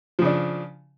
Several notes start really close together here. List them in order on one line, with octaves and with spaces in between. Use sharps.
F3 C#3 D4